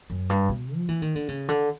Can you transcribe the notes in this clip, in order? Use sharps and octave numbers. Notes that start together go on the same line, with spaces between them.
F#2
G2
B2
F3
E3
D#3
D3
C#3
D3